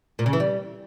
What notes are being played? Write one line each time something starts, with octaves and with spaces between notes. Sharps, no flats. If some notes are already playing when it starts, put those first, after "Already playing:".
A#2
C#3
E3
G3